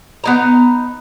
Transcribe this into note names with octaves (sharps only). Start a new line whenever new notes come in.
B3 D#4 A#5